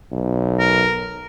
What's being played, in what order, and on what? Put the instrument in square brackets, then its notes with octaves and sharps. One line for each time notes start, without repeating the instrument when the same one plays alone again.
[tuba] B1
[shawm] A#4